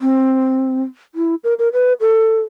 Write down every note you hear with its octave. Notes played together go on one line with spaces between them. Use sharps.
C4
E4
A#4
A#4
B4
A4